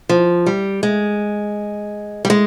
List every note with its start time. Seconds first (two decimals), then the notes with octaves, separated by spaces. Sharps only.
0.09 F3
0.47 G3
0.83 G#3
2.25 G3
2.30 G#3